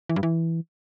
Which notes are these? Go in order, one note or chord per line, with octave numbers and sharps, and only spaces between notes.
E3
G2
E3